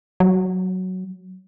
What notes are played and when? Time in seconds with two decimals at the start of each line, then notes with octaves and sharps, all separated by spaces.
0.20 F#3